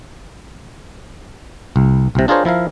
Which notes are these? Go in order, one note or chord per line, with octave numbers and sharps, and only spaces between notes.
C2
C2 C3
D4 F4 G#4 A#4 C5 C#5
F3 E4 A#4 F5